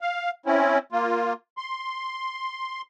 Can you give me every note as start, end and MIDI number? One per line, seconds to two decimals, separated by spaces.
0.01 0.30 77
0.46 0.78 60
0.46 0.78 61
0.46 0.78 64
0.92 1.33 58
0.92 1.33 65
1.58 2.82 84